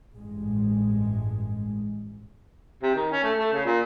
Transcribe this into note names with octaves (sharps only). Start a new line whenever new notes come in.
A1 G2 G#3
C3
D#3
C#4
A3
A3
C#3
A#2